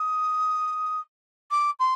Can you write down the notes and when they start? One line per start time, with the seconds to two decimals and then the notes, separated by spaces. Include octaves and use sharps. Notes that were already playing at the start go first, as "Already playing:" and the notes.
Already playing: D#6
1.51 D6
1.79 C6